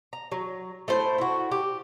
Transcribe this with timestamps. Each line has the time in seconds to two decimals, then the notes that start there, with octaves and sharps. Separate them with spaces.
0.13 A#5
0.32 F#3
0.88 A3 E4 C5
1.18 E4 F#4
1.51 G4